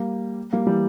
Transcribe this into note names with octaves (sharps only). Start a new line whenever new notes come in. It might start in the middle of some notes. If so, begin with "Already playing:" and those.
Already playing: G3 A#3
G3 A#3
E3 G3